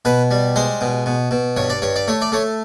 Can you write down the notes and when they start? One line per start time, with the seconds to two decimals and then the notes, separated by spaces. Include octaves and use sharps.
0.05 B2 B4
0.31 G3
0.56 G#3 C5
0.81 B2
1.06 B2
1.31 B2
1.57 G2 C#5
1.70 D5
1.82 G2 C#5
1.96 D5
2.08 A3 C#5
2.22 D5
2.32 A3 C#5